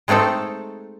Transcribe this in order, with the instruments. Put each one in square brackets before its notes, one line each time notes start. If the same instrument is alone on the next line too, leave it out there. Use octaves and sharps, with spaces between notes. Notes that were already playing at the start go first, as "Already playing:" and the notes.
[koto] G#3 A3 C4 D#4 A4